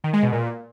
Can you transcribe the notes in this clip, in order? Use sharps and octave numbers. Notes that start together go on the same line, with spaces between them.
D#3
G#3
B2
A#2